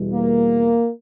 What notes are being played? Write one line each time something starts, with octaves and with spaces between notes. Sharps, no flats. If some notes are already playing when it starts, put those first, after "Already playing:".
Already playing: E2 B2 G3
A#3